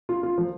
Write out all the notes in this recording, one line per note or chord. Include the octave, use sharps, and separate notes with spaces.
F4
F4
F3